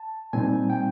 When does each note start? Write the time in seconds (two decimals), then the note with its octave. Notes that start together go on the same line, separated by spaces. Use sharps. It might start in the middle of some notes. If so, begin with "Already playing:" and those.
Already playing: A5
0.33 A#2 G3 C4 D#4 G#5
0.70 G5